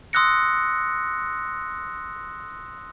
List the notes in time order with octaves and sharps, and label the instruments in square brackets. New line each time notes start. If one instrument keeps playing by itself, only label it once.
[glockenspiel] C6 D#6 E6 F#6 A#6 C#7